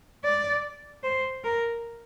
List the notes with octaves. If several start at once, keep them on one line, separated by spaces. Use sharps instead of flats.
D5
C5
A#4